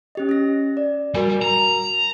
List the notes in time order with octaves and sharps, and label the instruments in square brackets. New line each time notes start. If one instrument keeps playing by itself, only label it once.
[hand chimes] C#4 G4 D#5
C#4 A#6
D5
[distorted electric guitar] G3 [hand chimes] F#4 A#4 G#5
[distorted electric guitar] A#5